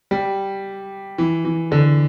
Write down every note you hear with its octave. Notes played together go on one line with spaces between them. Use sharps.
G3
E3
E3
D3